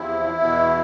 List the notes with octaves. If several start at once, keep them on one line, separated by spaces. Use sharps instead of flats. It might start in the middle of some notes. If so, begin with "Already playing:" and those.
Already playing: E2 C3 F3 E4
E2 B2 B3